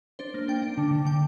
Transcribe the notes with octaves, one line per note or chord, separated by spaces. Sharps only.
D4 C5
A#3
D4 G5
D4
D3
D3
D3 G5